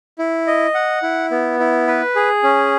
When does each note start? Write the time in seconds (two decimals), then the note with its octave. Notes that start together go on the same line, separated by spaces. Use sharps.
0.19 E4
0.47 D#5
0.74 F#5
1.03 E4
1.31 B3
1.60 E4
1.87 B4
2.16 G#4
2.43 C#4